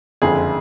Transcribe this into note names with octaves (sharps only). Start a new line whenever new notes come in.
F#1 F2 D3 G#4